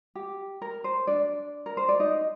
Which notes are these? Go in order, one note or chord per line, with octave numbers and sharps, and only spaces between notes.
G4
A#4
C5
D4 D5
A#4
C5
D5
D#4 D#5